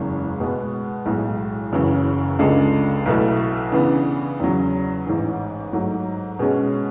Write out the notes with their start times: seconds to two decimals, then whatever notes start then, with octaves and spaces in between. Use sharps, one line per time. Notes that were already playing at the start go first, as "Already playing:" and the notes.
Already playing: F#1 E2 C#3 G#3
0.40 B2 G#3 B3
1.06 B1 A2 G#3
1.72 F#1 F#2 C#3 E3
2.39 C#2 C#3 G#3 D4 A4
3.06 B1 B2 A3 E4
3.72 C#3 E3 B3 D4
4.40 E2 C#3 F#3
5.06 A1 G#2 E3
5.73 G#2 F#3 A3
6.39 B2 G#3 C#4 G#4